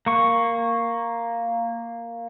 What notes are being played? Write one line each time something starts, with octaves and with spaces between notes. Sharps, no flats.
A#3 C#6